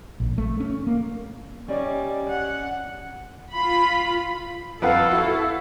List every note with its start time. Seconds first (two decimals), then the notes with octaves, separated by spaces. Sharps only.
0.20 A#1
0.38 A3
0.60 C#4
0.87 A#3
1.68 G3 C#4 D5 D#5
2.29 F#5
3.54 F4 B5
4.82 F2 A4 B4 F5 F#5
5.11 E4 F#4